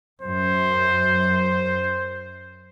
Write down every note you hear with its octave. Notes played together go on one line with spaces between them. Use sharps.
F#2 C5